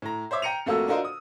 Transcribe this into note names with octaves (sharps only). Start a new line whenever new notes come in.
A2 A#5
C5 C#5 E5 D6
G5 A#5 C#7 D#7 F7
F2 A3 A#3 F#4 A4 E6
D4 F4 F#4 A#4 C5 D#5
D#6